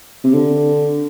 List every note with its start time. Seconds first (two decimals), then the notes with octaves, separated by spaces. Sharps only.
0.24 C3
0.34 D3